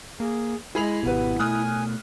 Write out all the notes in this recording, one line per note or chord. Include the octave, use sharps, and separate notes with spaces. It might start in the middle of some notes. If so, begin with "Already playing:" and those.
A#3 G#4
G#3 E4 G#4 B5 F7
G#1 B2 G3 B3 B4
B2 A3 G#5 D#6 F6 F#6